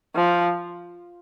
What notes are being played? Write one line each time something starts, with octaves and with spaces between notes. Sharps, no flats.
F3